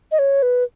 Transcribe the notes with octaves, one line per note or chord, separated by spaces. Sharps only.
D#5
C#5
B4